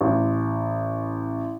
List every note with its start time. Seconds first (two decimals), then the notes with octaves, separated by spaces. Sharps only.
0.01 A1